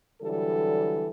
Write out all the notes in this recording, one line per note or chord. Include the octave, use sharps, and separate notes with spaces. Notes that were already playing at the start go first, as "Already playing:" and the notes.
D3 E3 F#3 G3 G4 A4